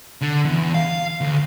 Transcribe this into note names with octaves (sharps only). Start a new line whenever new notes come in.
D3
E2
F5
D2